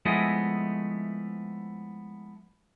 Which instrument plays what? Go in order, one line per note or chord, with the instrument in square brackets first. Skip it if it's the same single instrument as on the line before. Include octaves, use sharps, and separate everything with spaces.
[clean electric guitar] F3 G#3 A3 B3 E4 D#5